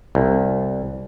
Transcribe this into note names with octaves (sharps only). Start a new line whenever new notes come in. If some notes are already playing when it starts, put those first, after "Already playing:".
C2